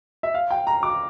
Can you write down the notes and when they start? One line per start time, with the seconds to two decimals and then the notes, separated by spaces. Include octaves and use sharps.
0.23 E5
0.34 F5
0.50 G5
0.67 A#5
0.83 D6